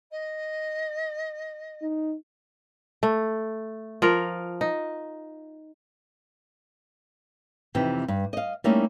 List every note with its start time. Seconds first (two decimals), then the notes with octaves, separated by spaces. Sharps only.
0.11 D#5
1.82 D#4
3.03 A3
4.02 F3 F4 A#4
4.61 D#4
7.75 F2 C3 E3 D#4 G5
8.08 G2
8.33 D#5 F5
8.64 G3 A3 A#3 C#4 D#4 E4